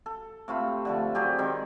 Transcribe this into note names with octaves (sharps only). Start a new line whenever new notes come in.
A4
C3 A3 F4 B5
D3 F3 A3
F#3 C4 G4 G#4
D#3 G#3 C4